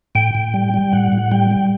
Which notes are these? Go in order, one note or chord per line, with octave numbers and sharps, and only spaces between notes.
A2 G5
A2
G3
G3
A2 F#5
A2
G3 G5
G3